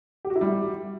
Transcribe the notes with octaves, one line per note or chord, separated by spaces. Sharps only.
G4
F#4
E4
G3